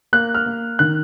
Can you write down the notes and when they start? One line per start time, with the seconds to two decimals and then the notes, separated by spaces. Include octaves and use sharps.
0.13 A#3 F#6
0.35 F6
0.46 A#3
0.79 D#3 F#6